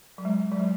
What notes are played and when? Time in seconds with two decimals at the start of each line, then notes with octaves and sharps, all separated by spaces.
0.18 F#3
0.25 G#3
0.52 F#3
0.60 G#3